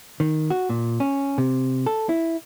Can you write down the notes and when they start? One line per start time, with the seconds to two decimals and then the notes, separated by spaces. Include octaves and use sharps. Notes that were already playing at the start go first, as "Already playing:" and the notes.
0.20 D#3
0.50 F#4
0.69 A#2
1.00 C#4
1.38 C3
1.86 A4
2.09 E4